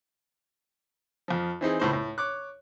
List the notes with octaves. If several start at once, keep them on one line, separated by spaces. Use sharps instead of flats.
F2 F3
E3 C4 D#4 G#4
C#2 A2 C5
A2
C#5 D6 F#6